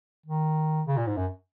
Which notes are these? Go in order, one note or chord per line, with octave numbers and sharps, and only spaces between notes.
D#3
C#3
A#2
G#2
F#2